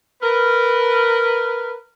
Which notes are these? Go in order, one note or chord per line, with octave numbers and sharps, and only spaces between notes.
A#4 B4